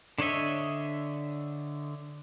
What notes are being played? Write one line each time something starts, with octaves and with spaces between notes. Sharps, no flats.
D3 D4 C#5 D#5 E5